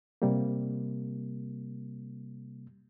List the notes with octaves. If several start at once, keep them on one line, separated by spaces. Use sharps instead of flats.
C3 G3 A#3